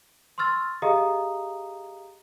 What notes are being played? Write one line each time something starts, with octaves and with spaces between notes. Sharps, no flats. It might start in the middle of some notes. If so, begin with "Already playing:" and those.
C6 C#6 E6 F6 A6
G4 G#4 D#5 F5 A#5 D#6